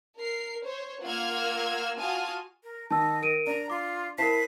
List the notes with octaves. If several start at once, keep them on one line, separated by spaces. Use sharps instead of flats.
A#4 C7
C5 C#5
A#3 F4 F#5 E6 F6 G#6
F4 F#4 G#5 A5 D#6 F6
A#4
D#3 D#5 A5 E6
A#4 D7 D#7
D4 A#5
F4 D6
E4 A#4 C5 A5 B6 C7